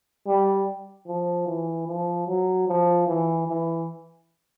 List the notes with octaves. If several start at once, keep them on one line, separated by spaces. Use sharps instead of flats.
G3
F3
E3
F3
F#3
F3
E3
E3